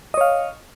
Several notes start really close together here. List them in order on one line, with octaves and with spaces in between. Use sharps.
D#5 C#5 F5